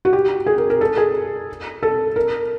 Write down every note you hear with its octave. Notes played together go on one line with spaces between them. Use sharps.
F#4
G4
G#4
A#4
A#4
A4
G#4
A4
A#4